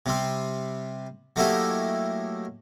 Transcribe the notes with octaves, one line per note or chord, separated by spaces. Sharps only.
C3 G3 C4
F#3 A3 A#3 D#4 E4 G4